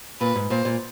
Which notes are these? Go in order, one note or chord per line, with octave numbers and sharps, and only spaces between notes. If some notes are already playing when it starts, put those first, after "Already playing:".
A#2 B4
G#2
A#2 C5
A#2